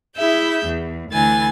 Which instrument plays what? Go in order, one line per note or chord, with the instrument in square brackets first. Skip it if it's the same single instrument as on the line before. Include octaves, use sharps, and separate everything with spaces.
[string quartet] E4 G#4 E5 G6
E2
D2 D3 E3 G#5 A6